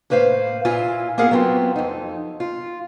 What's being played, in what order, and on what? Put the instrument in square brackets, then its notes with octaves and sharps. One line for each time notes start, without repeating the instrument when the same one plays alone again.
[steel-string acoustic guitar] A2 A#3 B4 C5 F5
A#2 E4 F4 G#5
A#3 B3 G#4 A#4 F5 F#5
F#3 B3 C4 F4
F2 D#4
F4